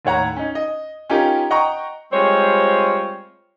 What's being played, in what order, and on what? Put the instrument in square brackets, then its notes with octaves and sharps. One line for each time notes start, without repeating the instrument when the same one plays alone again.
[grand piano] D#2 A2 C#5 F#5 A#5
C#4 D#4
D#5
C#4 D#4 F4 G4 A#4
D#5 F#5 G5 A#5 C#6
[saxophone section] G3 G#3 C4 F4 C5 C#5